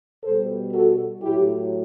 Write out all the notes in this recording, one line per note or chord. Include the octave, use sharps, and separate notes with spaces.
B2 G3 A4 C5
F#4 A4
A2 F#3 E4 G4